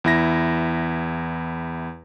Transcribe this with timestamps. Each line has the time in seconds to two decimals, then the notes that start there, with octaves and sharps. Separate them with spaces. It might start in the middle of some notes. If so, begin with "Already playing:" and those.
0.04 E2 E4 A#6